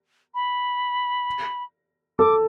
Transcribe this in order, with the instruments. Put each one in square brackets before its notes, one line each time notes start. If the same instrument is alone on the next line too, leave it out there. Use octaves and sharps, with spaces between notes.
[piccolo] B5
[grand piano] A4 [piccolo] D6